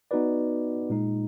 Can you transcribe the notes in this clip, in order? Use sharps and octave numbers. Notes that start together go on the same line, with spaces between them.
B3 D#4 F#4 B4 D5
A#2 G#3 D#4